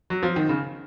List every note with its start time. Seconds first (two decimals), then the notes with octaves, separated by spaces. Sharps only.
0.10 F#3
0.23 F3
0.36 D#3
0.49 C#3